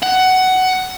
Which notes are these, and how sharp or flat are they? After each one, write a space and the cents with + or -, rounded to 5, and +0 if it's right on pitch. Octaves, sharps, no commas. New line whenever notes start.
F#5 +15